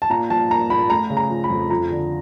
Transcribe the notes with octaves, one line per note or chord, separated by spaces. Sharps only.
A5
A#2 A#5
F3 A5
A#3 A#5
A#2 B5
A3 A#5
C#3
A#5
F3
B5
F2
F2 A#5
D3